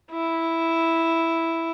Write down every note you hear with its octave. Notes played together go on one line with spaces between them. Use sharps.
E4